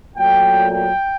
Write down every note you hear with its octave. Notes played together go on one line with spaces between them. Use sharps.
A#2 F#3 A3 G5
G5